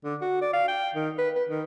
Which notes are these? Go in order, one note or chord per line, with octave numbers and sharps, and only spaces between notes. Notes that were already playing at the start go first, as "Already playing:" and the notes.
D3
F#4
D5
F5
G5
D#3
B4
B4
D#3